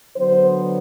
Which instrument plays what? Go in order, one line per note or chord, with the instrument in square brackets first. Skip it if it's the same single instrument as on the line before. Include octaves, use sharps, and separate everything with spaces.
[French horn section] D3 F#3 B3 D4 C5